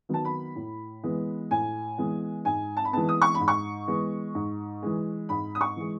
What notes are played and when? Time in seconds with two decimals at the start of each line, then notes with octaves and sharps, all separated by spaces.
0.09 D#3 F#3 B3 A5
0.25 B5
0.56 A2
1.03 E3 G#3 B3
1.51 A2 G#5
1.98 E3 G#3 B3
2.45 G#2 G#5
2.77 A5
2.85 B5
2.93 E3 G#3 B3 A5
3.09 D#6
3.22 C#6
3.35 B5
3.40 G#2
3.48 C#6
3.88 E3 G#3 B3
4.35 G#2
4.83 E3 G#3
5.29 G#2 B5
5.55 D#6
5.61 C#6
5.76 E3 G#3